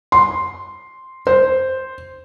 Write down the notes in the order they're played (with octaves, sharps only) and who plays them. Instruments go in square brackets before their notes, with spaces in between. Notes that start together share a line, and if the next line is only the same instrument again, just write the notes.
[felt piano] C6
C5